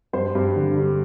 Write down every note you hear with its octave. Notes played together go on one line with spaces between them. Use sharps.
G2 C5
G2
D3
G3